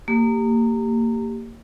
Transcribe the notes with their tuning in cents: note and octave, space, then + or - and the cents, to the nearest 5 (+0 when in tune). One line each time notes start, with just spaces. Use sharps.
A#3 -25 G4 +0